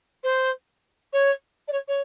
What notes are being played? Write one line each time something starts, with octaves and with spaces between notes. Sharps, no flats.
C5
C#5
D5
C#5
C#5